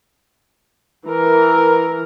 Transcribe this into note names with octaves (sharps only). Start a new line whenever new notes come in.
E3 A#4